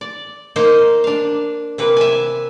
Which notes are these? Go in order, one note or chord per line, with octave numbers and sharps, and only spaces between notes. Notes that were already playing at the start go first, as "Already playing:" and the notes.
D5
A#3 D#4 C5 D#5
D4 F5
C3 A#3 B4
E5 G#5